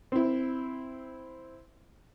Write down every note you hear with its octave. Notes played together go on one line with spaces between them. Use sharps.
C4 E4